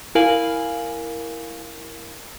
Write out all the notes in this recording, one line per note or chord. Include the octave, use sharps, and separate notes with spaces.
E4 A#4 F5 G#5 F#7